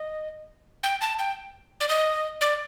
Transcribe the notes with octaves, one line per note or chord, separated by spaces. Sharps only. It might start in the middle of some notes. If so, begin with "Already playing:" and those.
Already playing: D#5
G5
A5
G5
D5
D#5
D5